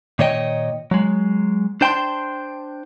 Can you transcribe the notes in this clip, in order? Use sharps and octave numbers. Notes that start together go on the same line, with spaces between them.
A#2 D#3 C#5 D#5 G5
F#3 G#3
D4 C5 G5 A5 B5 C6